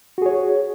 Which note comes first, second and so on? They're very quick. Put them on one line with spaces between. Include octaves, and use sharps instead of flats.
F#4 G#4 C#5